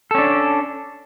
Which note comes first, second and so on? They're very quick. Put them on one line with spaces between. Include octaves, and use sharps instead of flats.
A4 C#4 D4